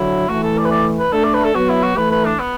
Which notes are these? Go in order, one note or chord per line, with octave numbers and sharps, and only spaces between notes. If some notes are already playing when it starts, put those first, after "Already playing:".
Already playing: D3 F#3 E4
E3 A3 F#4
A4
D5
B4
D5
B4
A3 D4 A4
D5
B4
A4
F#3 B3 F#4
E4
F#4
E3 A3 B4
B4
D4
B3